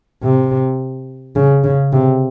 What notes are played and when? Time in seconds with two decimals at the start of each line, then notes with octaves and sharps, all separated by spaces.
0.22 C3
1.36 C#3
1.64 C#3
1.93 C3